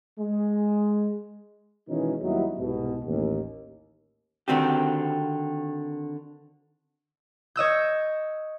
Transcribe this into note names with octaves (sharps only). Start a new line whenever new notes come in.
G#3
B2 D#3 E3 G#3 C#4 D#4
D#2 F#3 G3 B3 D#4 E4
C2 G#2 B2
A1 D#2
D3 D#3 C4 F#4 G4
C#5 D#5 E6 G6